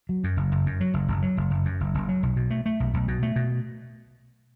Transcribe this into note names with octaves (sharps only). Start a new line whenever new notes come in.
F#3
F#2
F#1
F#1
F#2
F#3
F#1
F#1
F#3
F#1
F#1
F#2
F#1
F#1
F#3
B1
B2
A3
A3
B1
B1
B2
A3
B2